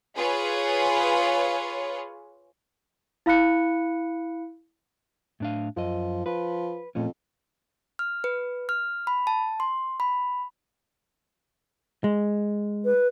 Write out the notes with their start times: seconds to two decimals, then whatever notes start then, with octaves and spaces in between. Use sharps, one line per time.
0.17 F4 G#4 B4 C#5
3.26 E4 F5 B5 F#6 C#7
5.40 A2 D4 F5
5.76 F#2 F3 D#5
6.26 F3 B4
6.95 F2 A#2 A3 C#4
7.99 F6
8.24 B4
8.69 F6
9.07 B5
9.27 A5
9.60 C6
10.00 B5
12.04 G#3
12.85 B4